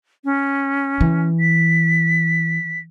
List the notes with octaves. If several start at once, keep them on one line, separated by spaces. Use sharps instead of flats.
C#4
E3
B6